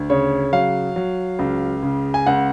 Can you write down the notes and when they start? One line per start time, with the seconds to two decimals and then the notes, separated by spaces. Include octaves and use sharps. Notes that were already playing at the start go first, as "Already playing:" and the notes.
Already playing: D2
0.10 C#3 C#5
0.52 F#3 F5
0.96 F#3
1.39 C#2
1.83 C#3
2.14 G#5
2.26 C#2 F#5